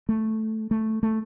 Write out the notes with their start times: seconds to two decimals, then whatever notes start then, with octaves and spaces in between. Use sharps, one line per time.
0.09 A3
0.71 A3
1.03 A3